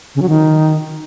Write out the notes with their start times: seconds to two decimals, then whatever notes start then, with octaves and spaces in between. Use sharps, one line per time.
0.15 C#3
0.22 F#3
0.29 D#3